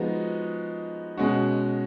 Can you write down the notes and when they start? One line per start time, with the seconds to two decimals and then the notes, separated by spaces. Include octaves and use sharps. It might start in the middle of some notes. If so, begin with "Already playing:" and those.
Already playing: F3 G#3 B3 D#4 F#4
1.17 B2 G#3 C#4 F#4